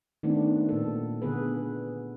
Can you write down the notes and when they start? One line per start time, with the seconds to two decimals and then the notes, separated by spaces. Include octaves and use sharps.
0.23 D#3 A3 B3 C4 D4
0.69 A#2 A4
1.22 D3 B3 G#4 B4